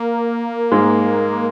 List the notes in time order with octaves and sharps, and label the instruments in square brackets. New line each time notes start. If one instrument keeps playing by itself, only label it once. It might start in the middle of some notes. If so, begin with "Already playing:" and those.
Already playing: [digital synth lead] A#3
[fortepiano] G#2 G#3